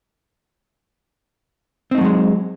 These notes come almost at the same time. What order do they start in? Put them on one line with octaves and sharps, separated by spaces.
C4 D#4 A3 F#3 G#3